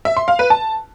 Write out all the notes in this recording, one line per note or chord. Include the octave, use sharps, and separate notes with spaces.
E5
C6
F5
B4
A5